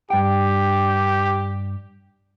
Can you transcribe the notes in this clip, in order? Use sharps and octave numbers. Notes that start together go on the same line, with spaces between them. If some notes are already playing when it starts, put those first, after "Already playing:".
G2 G4 G5